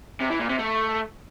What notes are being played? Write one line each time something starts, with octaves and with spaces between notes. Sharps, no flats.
C3
E3
A#2
C3
A3